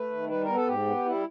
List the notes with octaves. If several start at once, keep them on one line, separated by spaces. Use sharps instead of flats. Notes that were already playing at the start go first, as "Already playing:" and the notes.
Already playing: A3 B4
D#3
G3 B4
A#4
B3
A4
G#2 G4
B3
G3 E4